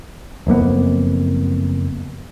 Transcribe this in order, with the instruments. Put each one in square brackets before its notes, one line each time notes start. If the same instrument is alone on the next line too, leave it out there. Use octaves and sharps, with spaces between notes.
[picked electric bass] F#1 F2 A#3 B3